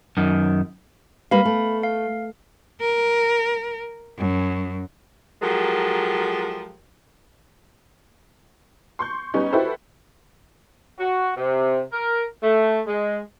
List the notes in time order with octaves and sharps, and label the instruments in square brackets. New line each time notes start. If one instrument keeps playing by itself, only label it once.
[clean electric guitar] F#2 D#3
[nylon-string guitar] G3 A#3 B4 [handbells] F5 B5
[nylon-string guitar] A3
[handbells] F5
[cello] A#4
F#2
[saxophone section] F3 F#3 G#3 G4 A4 A#4
[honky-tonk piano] C6 C#6 G6
G3 B3 C#4 D#4
E4 F#4 G4 A4 B4 C5
[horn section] F#4
C3
A#4
A3
G#3